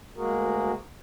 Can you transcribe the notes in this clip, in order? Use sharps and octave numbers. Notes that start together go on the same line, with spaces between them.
D2 G#3 A#3 F#4 G#4 A#4